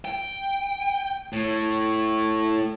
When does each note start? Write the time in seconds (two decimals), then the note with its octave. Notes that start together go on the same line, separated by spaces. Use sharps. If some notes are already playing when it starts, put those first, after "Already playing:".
0.05 G5
1.33 A2